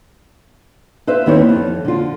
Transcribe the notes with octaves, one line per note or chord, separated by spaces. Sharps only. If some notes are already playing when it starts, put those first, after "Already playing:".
B4 C5 E5 F5
D#2 D#3 C4 E4 B4 C#5
F2
D3 F4